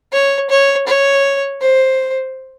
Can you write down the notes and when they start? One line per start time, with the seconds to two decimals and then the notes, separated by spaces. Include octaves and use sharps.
0.13 C#5
0.50 C#5
0.87 C#5
1.61 C5